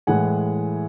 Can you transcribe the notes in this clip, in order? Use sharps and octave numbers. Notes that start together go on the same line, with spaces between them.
A2 E3 G#3 F#5 G#5